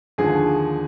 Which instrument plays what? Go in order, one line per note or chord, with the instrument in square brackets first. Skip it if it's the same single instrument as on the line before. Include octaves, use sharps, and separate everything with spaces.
[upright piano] D#2 D3 F3 G#4